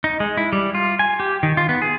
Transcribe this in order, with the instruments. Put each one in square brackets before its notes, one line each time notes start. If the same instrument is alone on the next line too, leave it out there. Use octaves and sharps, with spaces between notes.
[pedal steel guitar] D#4
G#3
E4
G3
F4
G#5
G4
D#3
F4
B3
G#4